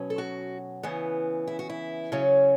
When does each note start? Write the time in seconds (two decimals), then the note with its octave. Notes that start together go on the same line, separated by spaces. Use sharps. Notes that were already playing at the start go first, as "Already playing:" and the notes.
Already playing: B2 F#3 C#4
0.10 A4
0.18 F#4
0.83 C#3 E3 B3
1.47 E4
1.59 F#4
1.69 E4
2.12 C#3 F#3 C#4